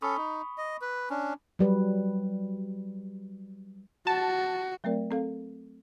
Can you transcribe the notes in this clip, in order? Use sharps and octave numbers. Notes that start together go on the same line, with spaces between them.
C#4 A4 B5 C#6 D#6
D#4
D#5
B4
C#4 D4
F#3 G3 B4
F#4 A5
F#3 A3 C4 A#4 D5
C4 A4 F5